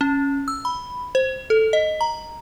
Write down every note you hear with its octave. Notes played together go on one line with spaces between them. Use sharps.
C#4
E6
B5
C5
A4
D#5
A#5